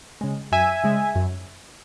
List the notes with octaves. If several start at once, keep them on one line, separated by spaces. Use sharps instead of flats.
C#3 G#3
F#2 E5 G#5
C#3 G#3
F#2